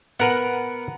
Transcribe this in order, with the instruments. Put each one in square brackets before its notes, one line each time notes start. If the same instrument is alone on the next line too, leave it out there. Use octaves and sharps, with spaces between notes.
[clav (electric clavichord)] B3 A#4 B4 [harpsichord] F#5